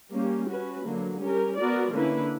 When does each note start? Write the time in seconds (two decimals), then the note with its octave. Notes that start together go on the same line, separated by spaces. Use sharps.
0.13 G3 A#3 C#4 G4
0.49 C#4 F#4 B4
0.85 D3 F#3 A#3
1.21 G3 C#4 G4 A#4
1.56 B3 F#4 A#4 D5
1.93 D3 A#3 C#4 E4 B4